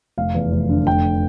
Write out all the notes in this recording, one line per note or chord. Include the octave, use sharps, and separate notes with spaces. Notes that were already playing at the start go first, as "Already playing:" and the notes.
F1 F5
E2
F1
D3
F1 G5